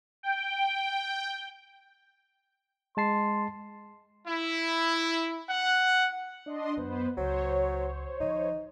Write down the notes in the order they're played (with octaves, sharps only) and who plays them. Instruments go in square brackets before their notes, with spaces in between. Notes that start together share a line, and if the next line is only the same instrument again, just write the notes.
[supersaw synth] G5
[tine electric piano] G#3 A5 C7 [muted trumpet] C6
[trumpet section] E4
F#5
[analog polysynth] D4 D#5 C6
[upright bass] F#2 [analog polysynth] B3 B4 C5
[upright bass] C#2 [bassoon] F#3 [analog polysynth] C5 C#5
[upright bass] D#3 F3 [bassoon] D#4